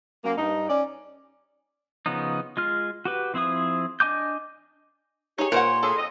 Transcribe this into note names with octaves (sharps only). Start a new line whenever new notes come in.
F#2 A#3
G2 D#4
C#4 D5
C#3 F3 B3 C#4 D#4
G#3 F4 F6
F#4 G4 B4
F3 C4 E4 G#4 D#6
D4 D#5 G#5 D6 G6
D#4 G4 G#4 C#5
A#2 A#4 C5 F#5 C6
A2 C#3 G#4 A4
F2 D#5